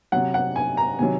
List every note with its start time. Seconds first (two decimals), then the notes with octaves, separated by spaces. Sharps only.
0.12 C3 F#3 F#5
0.34 F#5
0.56 G#5
0.77 A#5
0.99 C3 D#3 F#3 G#5